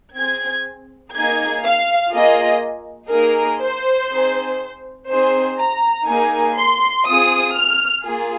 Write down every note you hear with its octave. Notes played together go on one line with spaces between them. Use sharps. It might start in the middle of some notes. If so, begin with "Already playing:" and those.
C4 G#4 G#6
A#3 D#4 G#4 G#6
F5
A#3 F4 G#4 D#5
A#3 D#4 G#4 A#4
C5
C4 D#4 G#4
C4 D#4 G#4 C5
A#5
A#3 D#4 G#4 G#5
C6
C4 F4 G#4 D#6
F6
A#3 F4 G#4